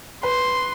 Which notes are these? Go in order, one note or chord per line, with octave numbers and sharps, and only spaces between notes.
B4 C6